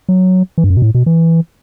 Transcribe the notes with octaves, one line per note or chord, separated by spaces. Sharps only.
F#3
E3
G2
F#2
B2
A2
B2
E3